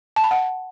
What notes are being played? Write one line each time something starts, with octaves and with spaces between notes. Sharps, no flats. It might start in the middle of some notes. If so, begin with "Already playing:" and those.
A5
B5
F#5